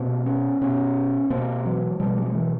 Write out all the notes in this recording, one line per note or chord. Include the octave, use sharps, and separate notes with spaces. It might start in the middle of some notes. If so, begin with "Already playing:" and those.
Already playing: B2 A#3 C4
B3 C#4
B2 B3 C#4
B2 A#3 C4
E3 F#3
B2 F3 G3
F#3 G#3
E3 F#3